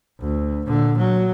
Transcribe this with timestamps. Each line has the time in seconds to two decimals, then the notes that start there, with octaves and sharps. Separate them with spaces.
0.20 D2
0.66 A#2 D3
0.98 F#3